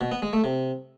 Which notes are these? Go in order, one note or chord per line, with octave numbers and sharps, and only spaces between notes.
B2
B3
G#3
A3
C3